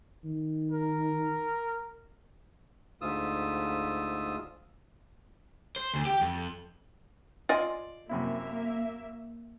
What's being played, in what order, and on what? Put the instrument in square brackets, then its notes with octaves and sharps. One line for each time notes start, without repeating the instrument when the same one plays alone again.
[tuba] D#3
[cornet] A#4
[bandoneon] D2 G#2 F4 D#6 E6
[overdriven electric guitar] C5
D2
G4
F2
[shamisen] F4 D#5 G#5 [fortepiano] D5 C6
[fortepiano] F#2 C3 E4 [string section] A#3 E5